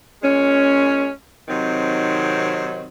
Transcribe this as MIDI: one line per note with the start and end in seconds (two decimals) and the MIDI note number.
0.23 1.09 46
0.23 1.09 56
0.23 1.09 61
1.48 2.87 48
1.48 2.87 51
1.48 2.87 54
1.48 2.87 60
1.48 2.87 63